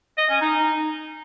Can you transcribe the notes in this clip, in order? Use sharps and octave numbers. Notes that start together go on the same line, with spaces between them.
D#5
C#4
D#4